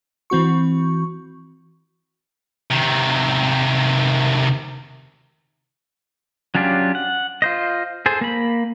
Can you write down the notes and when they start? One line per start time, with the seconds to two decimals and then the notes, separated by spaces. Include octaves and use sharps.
0.30 E3 C4 F#4 C#6
2.71 C3 D#3
6.55 F#3 C#4 D4 F4 G4
6.95 F#5
7.42 F4 C5 D#5
8.06 G#4 A4 C5
8.21 A#3 B5